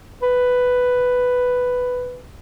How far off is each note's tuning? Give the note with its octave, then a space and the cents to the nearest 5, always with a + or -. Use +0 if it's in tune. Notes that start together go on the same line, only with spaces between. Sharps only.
B4 +5